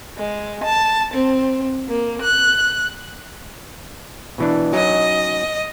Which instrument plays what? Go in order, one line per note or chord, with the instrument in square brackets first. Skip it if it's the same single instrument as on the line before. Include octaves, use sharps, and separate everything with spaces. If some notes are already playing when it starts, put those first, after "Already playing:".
[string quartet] G#3
A5
C4
A#3
F#6
[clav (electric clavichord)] B2 E3 D4
[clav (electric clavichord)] F#3 C#4 D#4 [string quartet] D#5